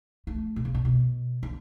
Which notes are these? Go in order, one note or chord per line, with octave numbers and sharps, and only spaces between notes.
A3
B2
C#3
B2
B2
D3